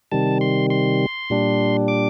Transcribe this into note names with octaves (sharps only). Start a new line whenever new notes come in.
C3 D#3 G3 A5
C6
C6
A#2 G3 D4
D6